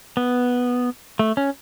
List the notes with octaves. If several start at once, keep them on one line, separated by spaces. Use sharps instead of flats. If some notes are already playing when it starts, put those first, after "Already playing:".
B3
A3
C#4